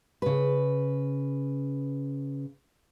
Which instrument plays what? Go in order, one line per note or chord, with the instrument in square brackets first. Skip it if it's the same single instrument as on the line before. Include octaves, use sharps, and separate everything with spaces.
[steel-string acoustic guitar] C#3 B4